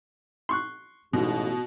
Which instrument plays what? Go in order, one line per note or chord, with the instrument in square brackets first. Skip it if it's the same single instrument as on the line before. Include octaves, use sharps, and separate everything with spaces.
[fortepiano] C6 C#6 F#6
[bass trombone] A1 [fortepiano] G#2 [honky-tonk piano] B2